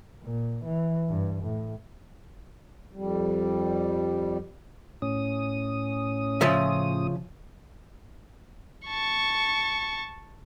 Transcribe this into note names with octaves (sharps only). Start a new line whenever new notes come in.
A#2
E3
G2
A2
F2 G3
A2 C#4 D#6
C#3 F3 E5
A5 C#6